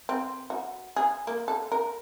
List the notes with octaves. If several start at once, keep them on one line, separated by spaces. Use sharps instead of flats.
C4
F#4
G#4
A#3
A4
A#4